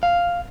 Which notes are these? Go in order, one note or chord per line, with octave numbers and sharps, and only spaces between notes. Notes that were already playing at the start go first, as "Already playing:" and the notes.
F5